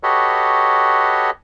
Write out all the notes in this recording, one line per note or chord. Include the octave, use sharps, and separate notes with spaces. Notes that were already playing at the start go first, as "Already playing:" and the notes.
F#4 G4 A4 B4 C#5 D#5